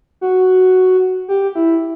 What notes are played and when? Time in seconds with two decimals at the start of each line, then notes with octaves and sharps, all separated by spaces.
0.21 F#4
1.28 G4
1.55 E4